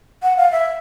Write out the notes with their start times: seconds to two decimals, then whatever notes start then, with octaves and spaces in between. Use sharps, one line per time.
0.23 F#5
0.37 F5
0.52 E5